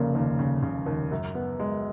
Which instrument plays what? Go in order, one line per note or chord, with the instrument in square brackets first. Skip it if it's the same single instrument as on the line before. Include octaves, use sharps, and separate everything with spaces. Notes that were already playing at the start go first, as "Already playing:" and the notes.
Already playing: [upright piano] F1 C#3 [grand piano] A#3
[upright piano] D#2
C#3
C#3
D#2
F#2
B3
G#3